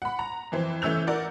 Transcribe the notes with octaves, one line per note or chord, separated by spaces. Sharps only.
F#5 B5
A#5
F2 E3 C5
E3 A3 C#4 E6 G6 F7
A#4 D5 F#5